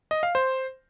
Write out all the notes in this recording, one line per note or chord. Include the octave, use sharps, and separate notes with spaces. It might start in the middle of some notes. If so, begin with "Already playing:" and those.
D#5
F5
C5